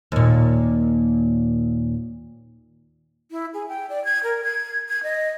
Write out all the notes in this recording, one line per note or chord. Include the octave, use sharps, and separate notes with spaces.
D#2 A#2
E4
G#4
G5
D5
G#6
A#4
G#6
G#6
D#5